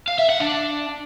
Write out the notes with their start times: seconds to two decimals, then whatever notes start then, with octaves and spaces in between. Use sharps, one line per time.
0.08 F5
0.19 E5
0.29 F#5
0.40 D4